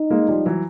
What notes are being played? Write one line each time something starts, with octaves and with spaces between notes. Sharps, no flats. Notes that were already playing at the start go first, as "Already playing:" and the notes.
Already playing: D#4
G#3 A#3
F3 G3
E3 F#3